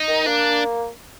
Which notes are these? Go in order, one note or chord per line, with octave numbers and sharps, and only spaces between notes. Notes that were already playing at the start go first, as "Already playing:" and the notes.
Already playing: D#4
D#3
A#3 D4